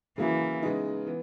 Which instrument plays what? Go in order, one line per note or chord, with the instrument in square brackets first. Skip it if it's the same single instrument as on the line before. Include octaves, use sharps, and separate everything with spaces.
[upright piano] C#3 F#3 A#3 E4 [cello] E3
[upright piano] C#3 G#3 B3 D#4
E3 B3